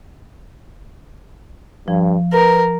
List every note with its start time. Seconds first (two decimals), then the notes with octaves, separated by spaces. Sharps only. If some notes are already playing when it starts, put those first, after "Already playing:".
1.88 G2 F3
2.33 A#4 B4